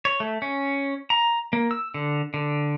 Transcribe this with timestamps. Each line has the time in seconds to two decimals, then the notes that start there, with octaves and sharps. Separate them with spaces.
0.05 C#5
0.20 A3
0.42 C#4
1.10 A#5
1.53 A#3
1.71 E6
1.94 D3
2.34 D3